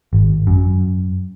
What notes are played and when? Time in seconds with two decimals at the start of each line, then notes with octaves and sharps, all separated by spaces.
0.13 G#1
0.47 F#2